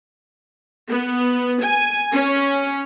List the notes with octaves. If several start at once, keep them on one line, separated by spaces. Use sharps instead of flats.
B3
G#5
C#4